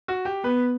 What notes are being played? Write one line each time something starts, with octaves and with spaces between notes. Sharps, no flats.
F#4
G4
B3 B4